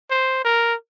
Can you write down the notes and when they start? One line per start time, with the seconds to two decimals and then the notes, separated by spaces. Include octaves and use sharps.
0.10 C5
0.44 A#4